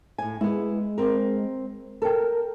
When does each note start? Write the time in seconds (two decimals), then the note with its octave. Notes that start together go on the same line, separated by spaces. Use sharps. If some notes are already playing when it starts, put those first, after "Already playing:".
0.18 A2 G#5
0.41 G#3 B3 E4
0.98 C4 A#4
2.02 A4 A#4 G5